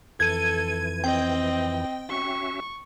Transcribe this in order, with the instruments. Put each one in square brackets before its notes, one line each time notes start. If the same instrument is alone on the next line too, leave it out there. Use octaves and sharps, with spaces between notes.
[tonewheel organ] F2 E3 [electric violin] A4 [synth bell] G#6 D#7
[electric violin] C4 D#5 [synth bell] G5
[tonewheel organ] C#4 F#4 E5 [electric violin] C#6